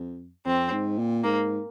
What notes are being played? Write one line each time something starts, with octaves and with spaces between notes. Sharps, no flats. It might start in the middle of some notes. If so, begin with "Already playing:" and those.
Already playing: F2
F2 C4
G#2
A#2
G#2 A#3